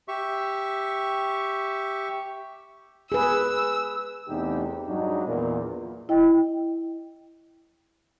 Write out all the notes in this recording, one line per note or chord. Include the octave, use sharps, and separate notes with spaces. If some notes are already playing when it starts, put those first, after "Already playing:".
G4 E5 C#6
G#4 B4 E6
E2 C3 A3 D#4 G4
G2 F#3 G#3 D4 D#4
A#1 E2 A#2
E4 D#5 G5